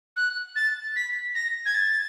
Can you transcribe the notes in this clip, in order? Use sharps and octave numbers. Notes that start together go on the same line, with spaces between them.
F#6
A6
B6
A#6
G#6
A6